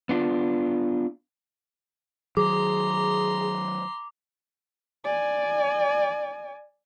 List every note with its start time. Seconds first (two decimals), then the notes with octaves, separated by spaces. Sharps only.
0.09 B3 D4 F4
2.37 D#3 F#3 G#4 A#5 C6 D6
5.04 D5 G#5